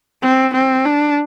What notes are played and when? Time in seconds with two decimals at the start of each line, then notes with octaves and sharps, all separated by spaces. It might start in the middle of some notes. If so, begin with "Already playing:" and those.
0.22 C4
0.54 C4
0.85 D4